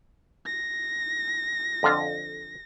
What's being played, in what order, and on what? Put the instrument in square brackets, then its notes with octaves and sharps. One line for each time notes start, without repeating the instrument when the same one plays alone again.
[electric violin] A#6
[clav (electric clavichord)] F2 D3 F4